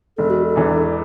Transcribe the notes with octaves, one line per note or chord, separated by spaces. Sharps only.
E1 A4
F#4
A4
E2 E3 D4